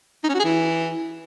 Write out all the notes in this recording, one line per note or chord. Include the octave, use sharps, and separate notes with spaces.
D#4
C#4
F#4
G#4
E3